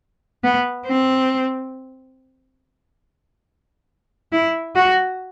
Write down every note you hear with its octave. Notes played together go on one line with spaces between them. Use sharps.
B3
C4
E4
F#4